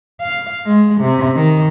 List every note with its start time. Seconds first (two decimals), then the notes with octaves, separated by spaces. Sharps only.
0.21 F5
0.66 G#3
1.01 C3
1.36 D#3